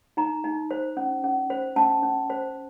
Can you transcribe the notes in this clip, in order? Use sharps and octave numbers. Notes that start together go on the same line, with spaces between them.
D#4 A#5
D#4
C5
C#4
C#4
C5
C#4 A5
C#4
C5